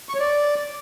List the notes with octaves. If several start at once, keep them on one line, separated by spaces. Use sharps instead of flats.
C#6
C#5
D5